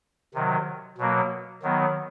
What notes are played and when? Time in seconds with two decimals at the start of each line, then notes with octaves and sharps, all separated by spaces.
0.34 C3 D#3 F#3
0.98 B2 F#3 A#3
1.63 D#3 F#3 B3